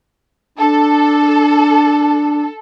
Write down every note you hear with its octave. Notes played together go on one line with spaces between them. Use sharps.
D4 A4